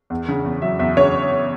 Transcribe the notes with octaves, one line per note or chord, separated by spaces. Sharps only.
E2
C#3
E2
F#3 E5
E2 E5
C#3 C#5